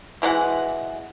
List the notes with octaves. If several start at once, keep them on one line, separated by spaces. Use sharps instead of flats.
B2 E3 G#3 F#5